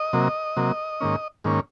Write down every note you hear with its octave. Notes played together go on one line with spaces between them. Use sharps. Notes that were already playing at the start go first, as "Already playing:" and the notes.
Already playing: D#5
C3 F#3 A#3
C3 F#3 A#3
G#2 D#3 A#3 C#4
G#2 D#3 A#3 C#4